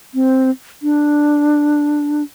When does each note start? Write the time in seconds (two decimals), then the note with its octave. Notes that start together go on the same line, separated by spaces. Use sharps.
0.14 C4
0.83 D4